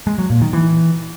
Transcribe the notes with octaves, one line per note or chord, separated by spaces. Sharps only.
G#3
F#3
A#2
D#3
E3